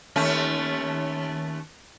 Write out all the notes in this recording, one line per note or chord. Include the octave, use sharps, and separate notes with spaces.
D#2 A3 C#4